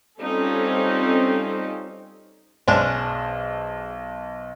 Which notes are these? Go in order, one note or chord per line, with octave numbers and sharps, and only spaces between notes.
G3 C4 C#4 D#4 F4 A4
B1 G#3 C#4 D4 C5